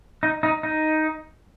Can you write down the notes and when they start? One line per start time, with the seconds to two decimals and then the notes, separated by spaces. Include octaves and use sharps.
0.23 D#4
0.43 D#4
0.63 D#4